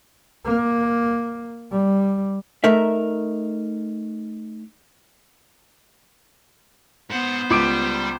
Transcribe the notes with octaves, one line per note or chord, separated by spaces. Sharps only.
A#3
G3
A3 D#4 A#4 E5
G#2 B3 C5 F#5
C#2 G3 D6 D7